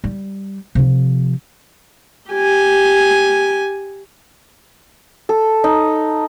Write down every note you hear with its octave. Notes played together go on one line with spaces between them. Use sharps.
G3
C3 F3
G4 G#5
A4
D#4